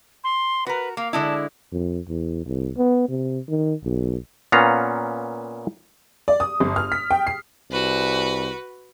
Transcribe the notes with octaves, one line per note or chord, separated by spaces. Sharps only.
C6
F#4 A#4 B4
A#3 F5
D3 G#3 E4 A5
F2
E2
C2
B3
C3
D#3
B1
A#2 B3 C#4 F5 A#5
D5
D#6
G1
F6
B6
G5
C7
C2 F#4 B4